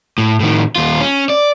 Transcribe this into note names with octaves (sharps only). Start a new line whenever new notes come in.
A2
A2 D#3
D#2 F4
C#4
D5